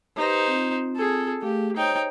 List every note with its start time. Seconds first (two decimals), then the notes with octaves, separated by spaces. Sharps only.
0.17 D#4 G4 B4 C5
0.48 C4 F4
0.96 G#4 A4
1.42 A3 G4 G#4 F5
1.76 D#4 C5 C#5 G5 A#5